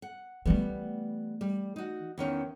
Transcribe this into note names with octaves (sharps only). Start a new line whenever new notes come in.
F#5
E3 G3 A3 B3
G3
D#4 F#4
E2 D#3 C#4